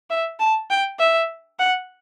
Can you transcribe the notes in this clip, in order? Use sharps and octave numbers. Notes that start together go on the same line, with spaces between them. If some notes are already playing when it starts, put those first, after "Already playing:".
E5
A5
G5
E5
F#5